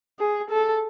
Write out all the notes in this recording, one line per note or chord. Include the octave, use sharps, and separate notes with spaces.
G#4
A4